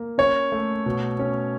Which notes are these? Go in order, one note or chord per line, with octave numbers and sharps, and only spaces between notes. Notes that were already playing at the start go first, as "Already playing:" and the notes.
Already playing: A#3
C#4 C#5
A3
B2
C#4